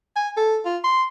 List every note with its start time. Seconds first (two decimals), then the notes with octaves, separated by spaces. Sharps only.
0.16 G#5
0.37 A4
0.65 F4
0.84 C6